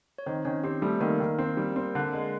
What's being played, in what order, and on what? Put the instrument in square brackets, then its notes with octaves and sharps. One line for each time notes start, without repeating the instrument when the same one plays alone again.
[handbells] C#5
[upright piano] D#3 [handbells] C4 C5
[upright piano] D#3 [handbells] C#4 C#5
[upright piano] C4 [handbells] G4
[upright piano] G3 [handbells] A3 A4
[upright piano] D#3 [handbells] A#3 A#4
[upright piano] D#3
C4
G3
C4
D3
G#3